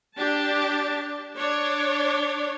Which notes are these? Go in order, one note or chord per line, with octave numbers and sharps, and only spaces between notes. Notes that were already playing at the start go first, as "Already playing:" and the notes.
D4 G4 A5
D4 C#5